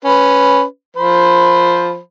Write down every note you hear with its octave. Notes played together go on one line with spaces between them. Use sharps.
C#4 B4
F3 C5 B5